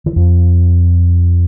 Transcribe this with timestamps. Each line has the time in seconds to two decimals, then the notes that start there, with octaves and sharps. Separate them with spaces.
0.06 E3
0.16 F2 F3